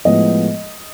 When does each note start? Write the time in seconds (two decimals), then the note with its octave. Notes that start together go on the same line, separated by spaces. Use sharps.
0.05 A2 F3 G#3 B3 D#5